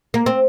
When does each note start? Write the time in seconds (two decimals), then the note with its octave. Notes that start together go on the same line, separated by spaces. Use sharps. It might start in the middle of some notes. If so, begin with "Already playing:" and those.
0.14 A#3
0.26 C4